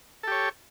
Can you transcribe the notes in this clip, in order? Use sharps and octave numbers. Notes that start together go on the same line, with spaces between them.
G4 A4 C#5